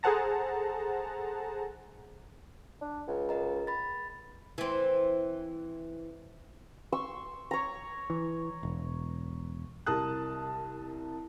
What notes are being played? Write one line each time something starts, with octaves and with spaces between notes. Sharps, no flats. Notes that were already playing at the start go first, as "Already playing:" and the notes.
G#4 A4 C5 F#5 A5 A#5
D4
C#2
A#4 D#5 A#5
B5 A6
E3 C4
C6 C#6 E6
C#5 A#5
E3
E1
C2 A#4 A5 D#6 F#6